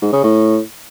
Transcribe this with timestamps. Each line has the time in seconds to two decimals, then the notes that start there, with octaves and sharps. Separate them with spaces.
0.02 G#2
0.13 C#3
0.24 A2